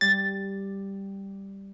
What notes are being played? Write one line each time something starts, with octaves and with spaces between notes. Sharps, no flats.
G3 A6